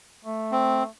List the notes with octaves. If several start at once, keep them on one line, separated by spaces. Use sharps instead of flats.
A3
C4